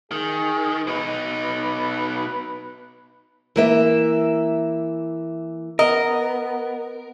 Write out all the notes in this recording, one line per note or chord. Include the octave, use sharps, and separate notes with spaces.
D#3 G#4
B2 D#4 B4
E3 A#3 E5
B3 A#4 D#5